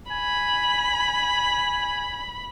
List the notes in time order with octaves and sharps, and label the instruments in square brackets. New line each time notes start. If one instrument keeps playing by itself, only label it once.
[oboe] G#5 [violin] B5